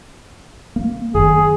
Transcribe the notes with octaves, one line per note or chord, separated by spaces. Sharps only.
A#3
F#1 F#2 D#3 G#4